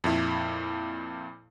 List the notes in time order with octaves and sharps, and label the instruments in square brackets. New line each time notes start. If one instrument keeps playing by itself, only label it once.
[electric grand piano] F2 A#2 E4